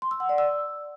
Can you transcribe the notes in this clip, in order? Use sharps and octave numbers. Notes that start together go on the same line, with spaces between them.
C6
E6
F#5
D5
E6